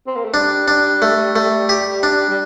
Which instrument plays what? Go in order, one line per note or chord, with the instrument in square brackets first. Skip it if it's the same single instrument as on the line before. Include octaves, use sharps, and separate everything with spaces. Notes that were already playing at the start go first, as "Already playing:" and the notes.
[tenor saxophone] C4
A#3
A3
[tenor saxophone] G3 [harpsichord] D4
[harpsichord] D4
A3
A3
G4
D4
[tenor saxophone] G3